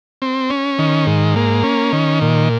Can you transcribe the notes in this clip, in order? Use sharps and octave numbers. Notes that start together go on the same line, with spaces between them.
C4
C#4
D#3
G#2
A#3
C#4
D#3
A#2